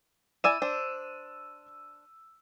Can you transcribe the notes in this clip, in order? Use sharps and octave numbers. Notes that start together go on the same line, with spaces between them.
E4 D5 G#5 E6 D#7 E7
D4 C5